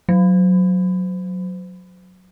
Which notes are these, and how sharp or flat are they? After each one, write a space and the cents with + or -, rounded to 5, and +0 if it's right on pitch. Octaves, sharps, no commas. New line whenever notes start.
F#3 -10